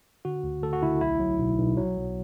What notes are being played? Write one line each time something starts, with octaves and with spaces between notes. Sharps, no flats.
D3 F#4
D2
D2 A4
F#4
D2 E4
B1 E4
F#3
B1
B1
F#3
B1